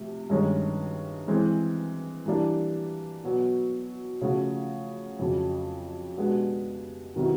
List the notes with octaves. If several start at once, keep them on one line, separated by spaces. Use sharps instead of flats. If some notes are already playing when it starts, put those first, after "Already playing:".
Already playing: C3 F3 A3
G2 D#3 G#3 C#4
E3 G#3 C4
E3 G3 A#3 D4
B2 F#3 B3
C#3 F3 A3 C#4 F#4
F2 C#3 F#3
B2 G#3 B3 D4 G4
C3 D#3 F#3 B3 E4